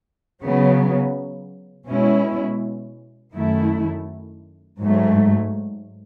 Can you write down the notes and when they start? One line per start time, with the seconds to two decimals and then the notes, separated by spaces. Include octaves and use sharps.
0.42 C#3 F#3 B3
1.87 B2 G#3 C#4 E4
3.34 F#2 D#3 A3 E4
4.79 G#2 F#3 A3